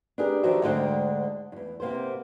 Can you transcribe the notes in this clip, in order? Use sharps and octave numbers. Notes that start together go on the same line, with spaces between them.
D4 D#4 G4 G#4 A#4 B4
D#3 F3 D#4 F#4 G4 E5
D2 G#2 D3 G#3 D4 G5
E2 G2
C3 A#3 B3 C5